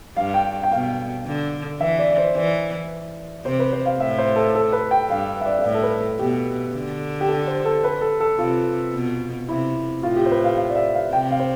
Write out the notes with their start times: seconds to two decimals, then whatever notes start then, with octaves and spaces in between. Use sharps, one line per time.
0.17 G2 F5
0.34 G5
0.63 G5
0.72 B2 F5
1.26 D3
1.80 E3 E5
1.99 D5
2.11 D5
2.18 C5
2.35 E3 D5
3.44 C3 C5
3.59 B4
3.72 C5
3.86 F5
3.99 A2 E5
4.18 C5
4.36 A4
4.55 A4
4.72 B4
4.91 G5
5.09 G2 F5
5.41 E5
5.46 D5
5.59 D5
5.64 A2 E5
5.74 A4
5.83 B4
6.00 A4
6.19 B2 G4
6.74 D3
7.21 G4
7.28 A4
7.47 C5
7.65 A4
7.84 B4
8.01 A4
8.20 A4
8.38 C3 F4
8.94 B2
9.48 C3 E4
10.03 A2 F4
10.16 G4
10.25 C5
10.31 B4
10.44 F5
10.57 F5
10.70 D5
10.75 E5
10.94 F5
11.13 C3 G5
11.31 F5
11.39 C5